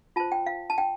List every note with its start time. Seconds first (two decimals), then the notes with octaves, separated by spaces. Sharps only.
0.16 F4 C5 A5
0.32 G5
0.46 F5
0.70 A5
0.78 G5